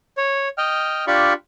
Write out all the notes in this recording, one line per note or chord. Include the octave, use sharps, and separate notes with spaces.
C#5
D#5 G5 F6
D4 F4 G4 D5 B5 C#6